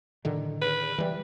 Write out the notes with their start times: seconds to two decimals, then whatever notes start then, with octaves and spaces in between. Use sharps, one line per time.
0.25 A2 D3 D#3
0.62 B4
0.98 E3 G3